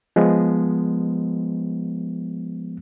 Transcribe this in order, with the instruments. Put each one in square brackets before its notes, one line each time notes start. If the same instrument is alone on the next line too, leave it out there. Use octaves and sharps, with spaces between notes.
[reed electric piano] F3 G#3 B3